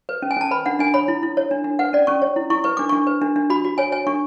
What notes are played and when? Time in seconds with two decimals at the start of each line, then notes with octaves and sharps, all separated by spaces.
0.09 B4
0.22 C#4
0.31 G#5
0.37 C#4 A5
0.51 B4 B5
0.66 D4 F#5
0.79 D4 G#5
0.94 C#5 B5
1.08 E4
1.23 E4
1.37 C#5
1.51 D4
1.64 D4
1.79 B4 F#5
1.93 C#4 D5
2.07 C#4 C#6
2.22 C#5
2.36 E4
2.50 E4 C#6
2.64 B4 C#6
2.77 D4 D6
2.89 D4 C#6
3.07 B4
3.22 D4
3.36 D4
3.50 F#4 B5
3.65 F#4
3.78 C#5 G#5
3.92 C#5 G#5
4.07 D4 C#6